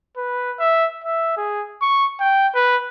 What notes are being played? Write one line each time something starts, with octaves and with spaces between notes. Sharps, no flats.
B4
E5
E5
G#4
C#6
G5
B4